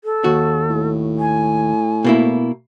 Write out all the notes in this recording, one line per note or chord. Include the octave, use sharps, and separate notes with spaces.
A4
D#2 F#4
A2
G#5
B2 A#3 E4